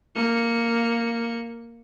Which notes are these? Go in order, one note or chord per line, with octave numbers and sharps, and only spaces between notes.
A#3 C#7